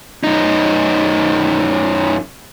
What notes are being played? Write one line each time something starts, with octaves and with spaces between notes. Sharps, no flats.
F#2 D#4